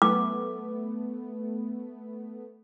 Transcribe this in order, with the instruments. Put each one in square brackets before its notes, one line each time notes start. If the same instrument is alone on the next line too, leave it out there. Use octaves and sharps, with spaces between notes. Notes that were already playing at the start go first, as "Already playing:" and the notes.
[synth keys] A3 B3 [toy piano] D6